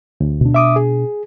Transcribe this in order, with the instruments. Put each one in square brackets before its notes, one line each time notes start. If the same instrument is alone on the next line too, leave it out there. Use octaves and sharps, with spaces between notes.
[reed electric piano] D2
[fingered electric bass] B2 D4
[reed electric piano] E5 D6 D#6
G#4